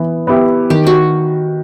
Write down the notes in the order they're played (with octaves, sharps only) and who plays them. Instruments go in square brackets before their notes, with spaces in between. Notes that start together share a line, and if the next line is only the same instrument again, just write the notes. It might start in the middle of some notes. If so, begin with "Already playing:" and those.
Already playing: [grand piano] E3 B3
B3 E4 G4
[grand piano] D#3 [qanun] G4
[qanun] F#4